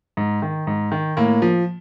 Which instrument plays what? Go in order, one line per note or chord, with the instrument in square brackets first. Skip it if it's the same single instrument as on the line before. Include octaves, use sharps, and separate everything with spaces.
[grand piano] G#2
D#3
G#2
D#3
A2 A#3
F3